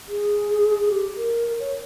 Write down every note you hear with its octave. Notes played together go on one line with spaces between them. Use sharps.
G#4
G4
A#4
C#5